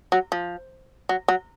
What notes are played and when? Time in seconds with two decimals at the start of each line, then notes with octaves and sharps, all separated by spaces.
0.12 F#3
0.32 F3
1.09 F#3
1.28 F#3